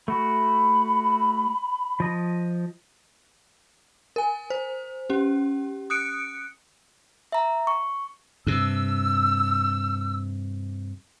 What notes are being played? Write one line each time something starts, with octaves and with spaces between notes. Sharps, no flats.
A3 F#4 B5
F3 D#5
A#4 G#5
C5
C#4 G4
D#6 F#6 C#7 D7
E5 A#5
C#6
G2 C3 E6